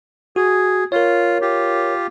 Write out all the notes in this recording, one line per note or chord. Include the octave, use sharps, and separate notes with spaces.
F#4 G#4
F4 A#4 C#5
F4 G4